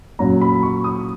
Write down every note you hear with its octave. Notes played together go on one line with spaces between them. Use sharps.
A#2 F#3 C#4 A#5
B5
C#6
D#6